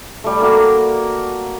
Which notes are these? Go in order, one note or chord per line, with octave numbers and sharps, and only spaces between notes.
G3 A3
A#3 F#4